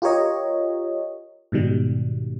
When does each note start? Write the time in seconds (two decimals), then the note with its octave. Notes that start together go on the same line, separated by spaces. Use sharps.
0.02 F4 G4 A#4 C#5 D#5
1.52 G#2 B2 D#3 G3